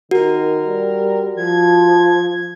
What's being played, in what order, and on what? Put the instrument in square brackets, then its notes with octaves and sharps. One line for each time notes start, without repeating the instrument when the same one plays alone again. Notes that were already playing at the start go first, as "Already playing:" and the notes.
[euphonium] D#3 [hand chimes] F#4 [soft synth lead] A#4
[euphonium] G3
[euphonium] F3 [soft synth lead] G#6